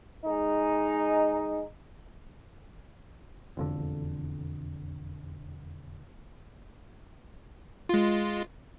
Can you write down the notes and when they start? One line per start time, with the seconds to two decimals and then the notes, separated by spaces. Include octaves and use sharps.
0.24 G#3 D#4
3.57 E1 F2 D3
7.89 G#3 F4